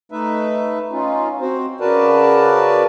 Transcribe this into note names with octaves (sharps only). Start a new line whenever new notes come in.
A3 D#4 B4 E5
C#4 D#4 F4
C4 F#4 C5
C#3 F#4 A#4 B4 D5 A5